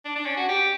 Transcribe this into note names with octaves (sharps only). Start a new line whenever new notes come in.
D4
D4
C#4
F#4
G4